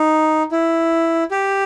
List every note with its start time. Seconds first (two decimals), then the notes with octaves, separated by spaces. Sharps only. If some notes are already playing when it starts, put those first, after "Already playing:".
Already playing: D#4
0.52 E4
1.31 G4